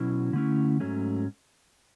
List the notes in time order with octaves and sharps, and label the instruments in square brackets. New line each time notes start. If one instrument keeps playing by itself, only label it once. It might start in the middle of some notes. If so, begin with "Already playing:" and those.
Already playing: [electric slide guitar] B2 F#3 C#4 E4
D3 A3 C#4 E4
G#2 F#3 A3 C#4